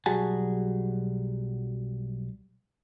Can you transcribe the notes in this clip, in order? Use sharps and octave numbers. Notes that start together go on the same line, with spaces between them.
B1 F#3 G3 F#4 G#4 A5